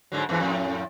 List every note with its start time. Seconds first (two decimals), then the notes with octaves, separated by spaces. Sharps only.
0.12 G#2 D3 F#3
0.29 E2 G#2 E3
0.40 F2 A2